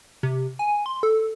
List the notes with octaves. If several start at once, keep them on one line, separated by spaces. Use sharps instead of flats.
C3
G#5
C6
A4